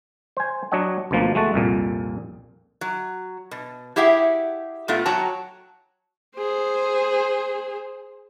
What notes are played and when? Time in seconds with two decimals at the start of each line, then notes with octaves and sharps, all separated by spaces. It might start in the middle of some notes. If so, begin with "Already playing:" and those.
0.37 C5 G#5
0.72 F#3 D4 C#5 D#5 F#5
1.11 D2 B2 F3 A#3
1.35 G#3 A3 F#4 A5
1.54 C2 F2 A#2
2.81 F#3
3.51 B2
3.96 E4 G4 G#4 E5 F#5 G5
4.88 A#2 A3 B3 F4
5.06 F#3 F#4 G5 A5 A#5
6.37 G#4 C5